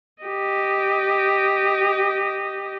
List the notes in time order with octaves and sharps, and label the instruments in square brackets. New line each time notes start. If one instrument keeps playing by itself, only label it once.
[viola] G4 D#5